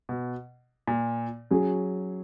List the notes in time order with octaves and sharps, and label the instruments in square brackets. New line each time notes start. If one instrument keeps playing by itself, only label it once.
[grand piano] B2
A#2
[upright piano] F#3 C#4 G#4